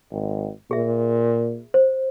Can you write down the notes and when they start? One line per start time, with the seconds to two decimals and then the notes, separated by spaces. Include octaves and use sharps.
0.11 G#1
0.71 A#2 G#4 E5
1.74 C5